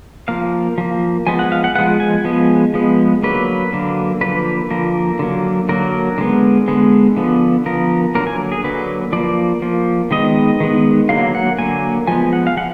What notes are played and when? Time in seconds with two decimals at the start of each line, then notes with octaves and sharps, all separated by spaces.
0.28 F3 A#3 F5
0.78 F3 A#3
1.27 F3 G#3 B3 G#5
1.39 F#5
1.52 F5
1.64 F#5
1.76 F3 G#3 B3 F#5
2.00 G#5
2.24 F3 G#3 B3
2.74 F3 G#3 B3
3.23 D3 F#3 A#3 B4
3.72 D3 F#3 A#3
4.21 D3 F3 A#3 B4
4.70 D3 F3 A#3 A#4
5.19 D3 F#3 A#3
5.69 D3 F#3 A#3 A#4
6.18 D3 G#3 B3
6.68 D3 G#3 B3
7.16 D3 F3 B3
7.65 D3 F3 B3 A#4
8.15 D3 F#3 A#3 A#4
8.27 G#5
8.52 G#4
8.64 D3 F#3 A#3 B4
9.13 F3 A#3 D5
9.62 F3 A#3
10.11 D#3 G#3 B3 D#5
10.60 D#3 G#3 B3
11.09 D3 F#3 A#3 F5
11.35 F#5
11.59 D3 F#3 A#3 G#5
12.07 F3 G#3 B3 G#5
12.33 F#5
12.47 F5
12.57 F3 F#5